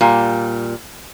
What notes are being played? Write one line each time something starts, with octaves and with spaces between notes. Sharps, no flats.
A#2 G3